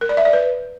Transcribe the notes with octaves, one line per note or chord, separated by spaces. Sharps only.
A#4
D5
E5
D5
B4